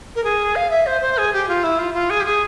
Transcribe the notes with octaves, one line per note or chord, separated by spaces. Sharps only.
A#4
G#4
F5
E5
C5
C5
G#4
G4
F4
E4
F4
F4
G#4
G4
G#4